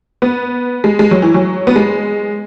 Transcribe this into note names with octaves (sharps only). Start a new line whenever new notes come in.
B3
G#3
G#3
F#3
E3
F#3
B3
G#3